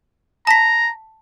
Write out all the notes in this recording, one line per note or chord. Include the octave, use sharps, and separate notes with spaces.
A5 A#5 B6